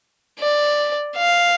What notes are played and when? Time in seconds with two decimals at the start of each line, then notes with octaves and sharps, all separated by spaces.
0.40 D5
1.18 F5